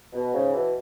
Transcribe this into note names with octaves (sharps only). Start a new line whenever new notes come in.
B2
G#2 C#3
B2 E3